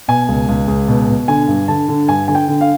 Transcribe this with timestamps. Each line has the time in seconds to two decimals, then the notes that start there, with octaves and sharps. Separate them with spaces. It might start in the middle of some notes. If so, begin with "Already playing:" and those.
0.08 B2 G#5
0.29 C#2
0.48 C#2
0.68 C#2
0.88 B2
1.09 B2
1.28 D3 G#5
1.48 G2
1.68 D3 A5
1.89 D3
2.08 G2 G#5
2.28 D3 G#5
2.35 G5
2.48 D3
2.61 F5